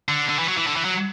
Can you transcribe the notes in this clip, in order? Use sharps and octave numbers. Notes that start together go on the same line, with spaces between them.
D3
D3
E3
F#3
E3
D3
E3
F#3